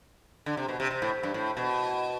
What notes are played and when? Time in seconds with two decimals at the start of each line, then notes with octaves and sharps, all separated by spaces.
0.46 D3
0.57 C3
0.68 B2
0.80 C3
0.91 C3
1.02 A2
1.23 G2
1.34 A2
1.57 B2